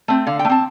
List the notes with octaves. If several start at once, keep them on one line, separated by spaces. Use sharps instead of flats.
A3 C4
D3 F5
G5
A3
C4 A5